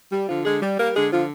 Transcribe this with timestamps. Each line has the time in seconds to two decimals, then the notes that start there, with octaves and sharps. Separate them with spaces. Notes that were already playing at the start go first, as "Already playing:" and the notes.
0.12 G3
0.28 D3 F3 F4
0.45 D3 G#3 G#4
0.62 G3
0.78 G3 A#3 A#4
0.95 D3 G#3 G#4
1.12 D3 F3 F4